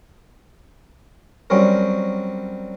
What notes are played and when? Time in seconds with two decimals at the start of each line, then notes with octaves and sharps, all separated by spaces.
1.50 F#3 G3 C4 C#4 A#4